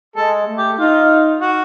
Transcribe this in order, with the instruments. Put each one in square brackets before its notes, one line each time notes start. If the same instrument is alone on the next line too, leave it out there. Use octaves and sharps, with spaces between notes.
[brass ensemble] G#3 [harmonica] A4
[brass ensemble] A3
[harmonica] G4
[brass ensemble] D#4 [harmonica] F4
[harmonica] F#4